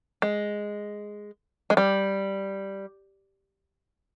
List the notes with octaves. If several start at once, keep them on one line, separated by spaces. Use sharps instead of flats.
G#3
G#3
G3